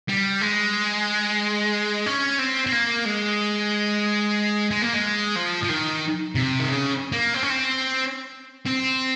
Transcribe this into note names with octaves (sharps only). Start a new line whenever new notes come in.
G3
G#3
C#4
C4
C4
A#3
G#3
G#3
A#3
G#3
F3
F3
D#3
C3
D#3
C#3
A#3
C4
C#4
C4
C4